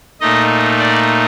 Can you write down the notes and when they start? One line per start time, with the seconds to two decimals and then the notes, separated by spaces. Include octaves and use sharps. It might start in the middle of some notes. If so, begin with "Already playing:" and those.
0.21 A#2 A3 D#4 D#5
0.79 D5